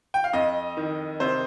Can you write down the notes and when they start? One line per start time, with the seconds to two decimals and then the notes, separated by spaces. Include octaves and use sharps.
0.14 G5
0.24 F5
0.33 F2 D#5
0.77 D#3
1.20 C3 C5